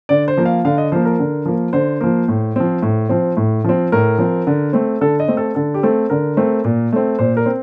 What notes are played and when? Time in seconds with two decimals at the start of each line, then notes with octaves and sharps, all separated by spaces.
0.09 D3 D5
0.28 C5
0.37 F3 A#3
0.45 F5
0.65 D3 F5
0.78 D#5
0.92 F3 A#3 C5
1.05 A#4
1.19 D3
1.46 F3 A#3
1.73 D3 C5
2.01 F3 A#3
2.28 A2
2.56 F3 C4
2.82 A2
3.09 F3 C4
3.37 A2
3.64 F3 C4
3.92 A2 A#4
4.18 F3 C4
4.47 D3
4.73 A3 C4
5.01 D3 A4
5.20 D#5
5.28 A3 C4
5.37 A4
5.55 D3 A4
5.74 G4
5.83 A3 C4 A4
6.10 D3 A#4
6.37 A3 C4
6.64 A#2
6.92 A3 C4
7.19 A#2 C5
7.37 A#4
7.46 C4